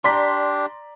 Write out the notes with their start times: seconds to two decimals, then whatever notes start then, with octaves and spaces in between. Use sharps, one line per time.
0.04 D4 G4 D5 A#5 C6 B6